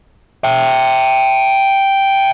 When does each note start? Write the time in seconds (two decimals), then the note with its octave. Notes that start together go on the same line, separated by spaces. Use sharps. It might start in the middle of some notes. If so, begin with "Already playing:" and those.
0.44 E5 G5